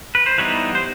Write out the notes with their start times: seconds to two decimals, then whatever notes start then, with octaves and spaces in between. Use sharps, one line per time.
0.15 B4
0.26 C5
0.38 E3 G3 B3 D#4 B4 C#5
0.75 C5